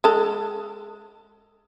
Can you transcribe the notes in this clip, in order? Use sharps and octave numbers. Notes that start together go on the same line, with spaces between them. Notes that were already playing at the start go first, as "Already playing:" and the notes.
G#3 A4